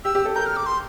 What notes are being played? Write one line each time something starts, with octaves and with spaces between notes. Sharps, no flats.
G4 E6
G4
A4
A#4 G6
F6
D6
C6